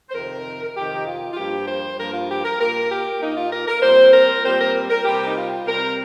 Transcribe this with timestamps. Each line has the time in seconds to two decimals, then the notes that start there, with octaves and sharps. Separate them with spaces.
0.09 C5
0.14 F2 C3 D#3 A#4
0.75 F2 C3 D#3 G4
0.95 D#4
1.06 F4
1.31 F4
1.37 G2 F3 A#3 G4
1.67 C5
1.98 G2 F3 A#3 A#4
2.14 F4
2.29 G4
2.44 A#4
2.60 A#2 A#3 A#4
2.91 G4
3.21 A#2 A#3 D#4
3.37 F4
3.51 A#4
3.67 A#4
3.82 A#2 G3 C4 C5
4.13 A#4
4.44 A#2 G3 C4 C5
4.59 A#4
4.89 A#4
5.04 C3 G3 C4 G4
5.27 D#4
5.36 F4
5.66 C3 G3 C4 A#4